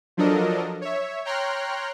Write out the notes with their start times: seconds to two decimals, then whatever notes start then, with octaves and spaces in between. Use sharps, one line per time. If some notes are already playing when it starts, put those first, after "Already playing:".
0.17 F3 F#3 D4 A4 A#4 D#5
0.81 C#5 E5
1.25 C#5 G5 A#5 C6 F6 F#6